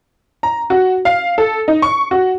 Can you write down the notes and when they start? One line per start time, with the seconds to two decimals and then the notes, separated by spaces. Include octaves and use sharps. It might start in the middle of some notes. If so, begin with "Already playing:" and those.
0.43 A#5
0.70 F#4
1.05 F5
1.38 A4
1.68 D#4
1.82 C#6
2.11 F#4